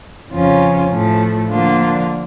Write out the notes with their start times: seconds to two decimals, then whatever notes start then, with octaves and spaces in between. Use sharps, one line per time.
0.32 F2 C#3 F3 C#4 F4
0.91 A2 F3 A3
1.49 D3 F3 A#3 D4 F4